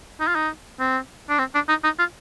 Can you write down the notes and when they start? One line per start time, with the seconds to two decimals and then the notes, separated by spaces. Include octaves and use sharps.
0.20 D#4
0.28 F4
0.35 D#4
0.80 C4
1.29 D4
1.39 C4
1.54 D4
1.69 D#4
1.84 D#4
1.99 F4